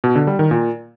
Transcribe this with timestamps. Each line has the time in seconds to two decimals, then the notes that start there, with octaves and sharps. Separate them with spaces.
0.04 B2
0.15 D3
0.27 G3
0.39 D#3
0.51 A#2